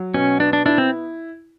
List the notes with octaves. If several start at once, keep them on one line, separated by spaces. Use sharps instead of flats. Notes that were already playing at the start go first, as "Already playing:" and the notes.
Already playing: F#3
B2 C#4
B3 D4
D4
D4 E4
C4